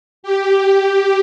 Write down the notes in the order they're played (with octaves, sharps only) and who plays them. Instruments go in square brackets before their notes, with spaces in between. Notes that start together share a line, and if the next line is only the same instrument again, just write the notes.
[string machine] G4